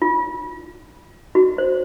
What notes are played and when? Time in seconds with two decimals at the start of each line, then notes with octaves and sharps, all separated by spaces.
0.02 F4
1.35 F#4
1.58 C5